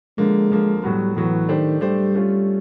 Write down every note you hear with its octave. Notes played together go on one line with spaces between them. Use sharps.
D3 F3 G#3 A#3
D3 F3 A#3
A2 F#3 G3 B3
A2 E3 F#3 B3
D#3 A3 D4 G4 C5
G3 A3 D4 G4 C5
A3 C#4 F4